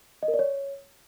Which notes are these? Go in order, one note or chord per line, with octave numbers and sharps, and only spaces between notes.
D#5
A#4
D5
C#5